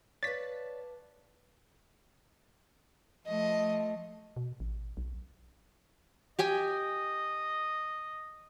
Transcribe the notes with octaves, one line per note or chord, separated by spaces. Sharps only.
B4 C#5 D5 F5 A5 A6 B6
F3 A3 D#5
B2
A1
B1
G4 D#5 G5 G#5